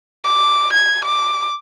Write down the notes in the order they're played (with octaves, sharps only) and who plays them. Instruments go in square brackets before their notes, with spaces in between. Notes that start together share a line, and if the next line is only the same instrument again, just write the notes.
[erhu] D6
G#6
D6